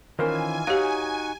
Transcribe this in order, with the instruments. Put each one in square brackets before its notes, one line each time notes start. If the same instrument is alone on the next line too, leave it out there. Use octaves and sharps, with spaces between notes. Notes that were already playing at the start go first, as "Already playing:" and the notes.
[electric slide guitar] D#3 E3 F4 [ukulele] C#4 A#4 C5 [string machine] G#5
[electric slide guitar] D#4 F#4 [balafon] G4 F5 [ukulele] C#5